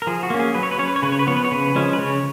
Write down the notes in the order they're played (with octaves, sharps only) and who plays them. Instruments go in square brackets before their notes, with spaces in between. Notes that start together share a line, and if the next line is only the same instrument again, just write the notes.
[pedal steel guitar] A#4
F3 G#4
F#4
A#3 C#4
G#4
F#3 B4
C#5
B4
C#4 C#5
B4
C#5
C#3 B4
C#5
B4
F3 B3 C#5
B4
C#5
C#3 B4
F3 G#3 C#4
B4
C#3 C#5